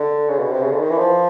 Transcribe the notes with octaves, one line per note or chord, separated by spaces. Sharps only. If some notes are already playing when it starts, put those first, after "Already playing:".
Already playing: D3
C#3
B2
C3
C#3
D3
D#3
E3
F3